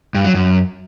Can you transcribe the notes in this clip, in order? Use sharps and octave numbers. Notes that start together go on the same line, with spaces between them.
G2
F#3
F#2